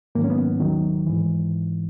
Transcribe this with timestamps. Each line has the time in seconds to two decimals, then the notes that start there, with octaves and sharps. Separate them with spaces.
0.15 G#2 D#3 F#3 A#3
0.24 C#4
0.30 B3
0.60 D#2 D#3 F#3
1.06 G#2 E3